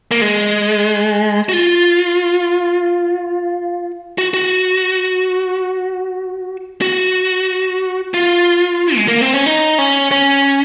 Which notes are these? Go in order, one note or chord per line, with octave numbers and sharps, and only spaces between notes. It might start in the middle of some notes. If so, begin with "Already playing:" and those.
A#3
G#3
F#4
F4
F#4
F#4
F#4
F4
G#3
A#3
C4
C#4
D#4
C#4
C#4